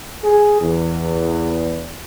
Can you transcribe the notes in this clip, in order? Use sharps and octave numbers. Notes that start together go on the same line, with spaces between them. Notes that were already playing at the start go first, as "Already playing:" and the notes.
G#4
E2